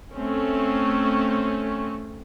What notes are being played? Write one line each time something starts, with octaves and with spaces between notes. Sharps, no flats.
A3 C4 C#4